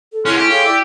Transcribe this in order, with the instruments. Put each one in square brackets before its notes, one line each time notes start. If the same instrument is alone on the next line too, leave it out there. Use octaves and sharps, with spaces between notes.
[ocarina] A4
[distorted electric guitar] G#3 C#4 [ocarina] E4 [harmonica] F#5 C6 F6
[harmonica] A3 C#4 [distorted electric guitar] G4
[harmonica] G#3 C#5 F5 [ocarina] A4
[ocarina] E4 [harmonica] D5 E5